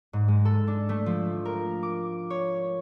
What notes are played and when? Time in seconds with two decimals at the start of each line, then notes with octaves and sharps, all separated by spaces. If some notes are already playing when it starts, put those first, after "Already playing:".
0.13 G#2
0.28 G#3
0.45 A4
0.68 D4
0.89 A3
1.06 F3
1.45 A#4
1.83 D6
2.30 C#5